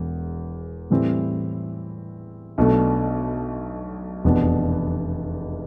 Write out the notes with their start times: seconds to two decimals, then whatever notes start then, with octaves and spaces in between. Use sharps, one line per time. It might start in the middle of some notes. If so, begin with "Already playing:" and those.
Already playing: E1 E2
0.90 A2 E3 G3 C4 E4
2.58 B1 B2 A3 D4
4.24 F1 E2 B2 B3 D4